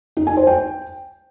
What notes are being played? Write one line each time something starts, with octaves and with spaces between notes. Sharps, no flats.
D#4
G#5
C5
G5